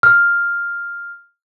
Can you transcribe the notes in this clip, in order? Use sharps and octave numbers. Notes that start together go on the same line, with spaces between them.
F6